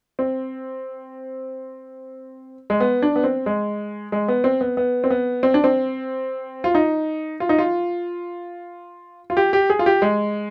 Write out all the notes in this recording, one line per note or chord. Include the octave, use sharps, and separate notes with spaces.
C4
G#3
B3
D4
B3
C4
G#3
G#3
B3
C4
B3
B3
C4
B3
C4
D4
C4
F4
D#4
F4
D#4
F4
F4
G4
G4
G#4
F4
G4
G#3